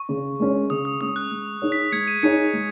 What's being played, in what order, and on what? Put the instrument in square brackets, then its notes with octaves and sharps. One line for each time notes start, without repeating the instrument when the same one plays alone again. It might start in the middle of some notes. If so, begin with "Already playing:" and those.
Already playing: [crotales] C#6
[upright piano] C#3
G#3 C#4
[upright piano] C#3 [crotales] D#6
[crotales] D#6
[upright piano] G#3 C#4 [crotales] D#6
[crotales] F#6
[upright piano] G#3
D#4 G#4 C#5
[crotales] B6
[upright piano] G#3 [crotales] G#6 C#7
[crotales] B6 D#7
[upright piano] D#4 G#4 C#5 [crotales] G#6 C#7
[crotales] B6
[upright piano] G#3